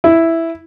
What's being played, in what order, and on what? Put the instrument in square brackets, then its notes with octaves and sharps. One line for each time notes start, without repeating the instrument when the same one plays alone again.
[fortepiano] E4